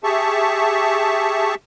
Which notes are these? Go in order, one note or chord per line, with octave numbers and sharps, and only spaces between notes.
G4 G#4 E5 A5 C#6